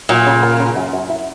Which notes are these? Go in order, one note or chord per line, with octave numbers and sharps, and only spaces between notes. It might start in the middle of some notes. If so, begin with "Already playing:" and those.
A#2 F#3
C#3
A#3
C#3
F#2
F#2
E4